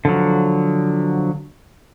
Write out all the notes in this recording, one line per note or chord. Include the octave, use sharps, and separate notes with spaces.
D3 F3 F#3